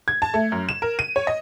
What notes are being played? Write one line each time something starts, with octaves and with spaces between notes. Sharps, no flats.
G#6
A5
A3
F#2
E7
A#4
D#7
C#5
D#5